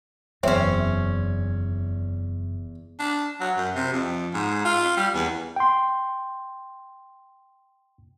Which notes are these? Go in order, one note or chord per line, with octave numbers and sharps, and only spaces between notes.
F#1 E2 F#3 C4 C#4 C#5 E5
D4
F#3
F#2
C3
F2
G#2
F4
G3
E2
G5 C6